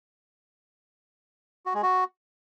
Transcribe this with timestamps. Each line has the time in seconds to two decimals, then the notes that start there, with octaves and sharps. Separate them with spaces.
1.66 F#4
1.74 G#3
1.83 F#4